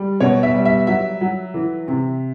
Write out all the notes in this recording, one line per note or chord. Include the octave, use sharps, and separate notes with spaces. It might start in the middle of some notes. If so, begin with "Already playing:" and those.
Already playing: G3
B2 C#5
E5
G3
E5
F#3 E5
F#3
E3
C3